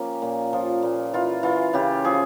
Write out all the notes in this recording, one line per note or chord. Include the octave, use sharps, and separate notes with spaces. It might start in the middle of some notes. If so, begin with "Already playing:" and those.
Already playing: F3 A#3 C#4 G4
A#2
F3
A#2
E3 F4
E3 F4
C#3 G4
F3 G#4